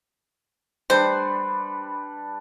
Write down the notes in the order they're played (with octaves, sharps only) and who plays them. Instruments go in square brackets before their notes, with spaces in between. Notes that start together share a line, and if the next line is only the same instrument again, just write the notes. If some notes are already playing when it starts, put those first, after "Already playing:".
[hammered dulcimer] G3 D4 B4 [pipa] C5